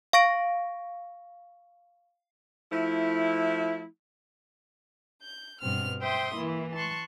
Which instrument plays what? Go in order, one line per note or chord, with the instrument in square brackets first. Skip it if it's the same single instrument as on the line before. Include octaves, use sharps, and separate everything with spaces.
[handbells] F5 C#6 A#6 D7
[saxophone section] F3 A3 E4
[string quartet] G6
G2 B2 C4 F6
C5 E5 G5 C6 D#6
E3 A#3 E4
A5 C6 C#6 F#6